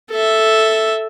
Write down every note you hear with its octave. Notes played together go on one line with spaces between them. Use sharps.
A4 E5